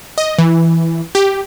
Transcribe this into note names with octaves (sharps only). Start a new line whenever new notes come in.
D#5
E3
G4